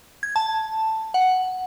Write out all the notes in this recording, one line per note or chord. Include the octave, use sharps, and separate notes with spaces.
G#6
A5
F#5